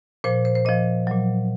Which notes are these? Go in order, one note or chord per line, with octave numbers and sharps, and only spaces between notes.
A#2 F3 C5
C5
C5
A#2 F3 D#5
A#2 F#3